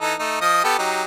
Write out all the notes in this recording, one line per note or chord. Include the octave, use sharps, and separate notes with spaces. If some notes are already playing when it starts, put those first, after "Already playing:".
E3 D#4 A4
A3 D#4
F3 D#5 D#6
B3 G4 A4
F#3 D#4 G4